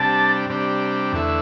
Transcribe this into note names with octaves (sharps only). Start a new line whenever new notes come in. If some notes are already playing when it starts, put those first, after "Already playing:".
Already playing: C3 G3 D4 A5
C3 G3 D4
E2 D3 A3 E4